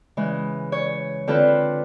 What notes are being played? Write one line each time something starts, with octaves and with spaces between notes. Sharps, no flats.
C#3 E3 G#3
C#5
D3 C4 F4 A4 B4